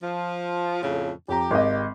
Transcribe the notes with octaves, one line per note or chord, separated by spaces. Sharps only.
F3
F2 A2 C#3
F2 G4 A#5
G#1 D#5